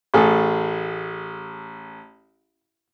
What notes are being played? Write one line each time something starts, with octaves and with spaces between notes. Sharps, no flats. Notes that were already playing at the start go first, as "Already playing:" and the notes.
A1 G#4 A4